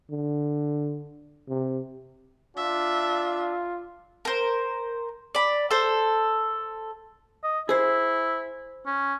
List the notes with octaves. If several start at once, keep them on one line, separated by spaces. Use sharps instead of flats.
D3
C3
D4 F4 E5
A#4 C5
D5 B5
A4 C5
D#5
E4 G#4 C5
C#4